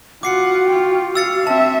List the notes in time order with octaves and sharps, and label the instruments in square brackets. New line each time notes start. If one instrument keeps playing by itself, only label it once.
[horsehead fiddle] F4 F#5 [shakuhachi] F#4 [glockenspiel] D6 C7 C#7
[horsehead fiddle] F4 G5
[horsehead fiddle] F5 [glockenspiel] E6 A6 C#7
[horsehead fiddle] C4 E5 [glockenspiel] A5